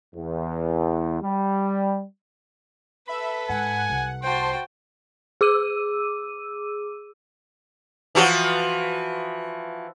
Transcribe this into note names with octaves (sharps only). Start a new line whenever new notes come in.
E2
G3
A4 B4 E5 B5
G#2 F#5 G#5
C2
F#4 C5 G5 A5 C6
G#4 D6 E6 D#7
E3 F3 F#4